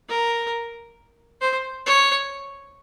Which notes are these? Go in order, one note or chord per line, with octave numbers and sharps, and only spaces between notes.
A#4
C5
C#5